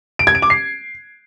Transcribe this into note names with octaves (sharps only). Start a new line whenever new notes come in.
D7
G#6
D7
D6
C7